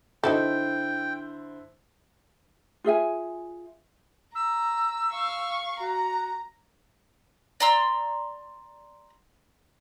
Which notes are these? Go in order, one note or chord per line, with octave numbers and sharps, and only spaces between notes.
D3 D#4 E4 F#4 A4 C5 G5
F4 G#4 E5 G#5
A#5 E6
F5 C#6
F#4 A#5
D5 A#5 C6 E6